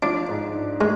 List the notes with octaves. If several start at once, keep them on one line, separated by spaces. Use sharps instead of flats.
F3 D4
G#2
D4
G#3